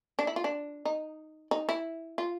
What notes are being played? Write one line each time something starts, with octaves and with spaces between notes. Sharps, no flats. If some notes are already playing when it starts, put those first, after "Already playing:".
D4
E4
F4
D4
D#4
D#4
E4
F4